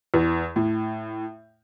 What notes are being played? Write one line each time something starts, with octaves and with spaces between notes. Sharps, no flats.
E2
A2